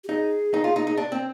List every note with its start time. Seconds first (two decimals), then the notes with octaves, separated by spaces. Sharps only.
0.04 G4
0.09 D#4 G#4
0.54 D#4
0.64 F4
0.76 D#4
0.87 D#4
0.97 D4
1.12 C4